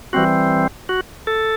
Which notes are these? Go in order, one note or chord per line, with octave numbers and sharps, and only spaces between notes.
E3 G3 C4 F#4
F#4
A4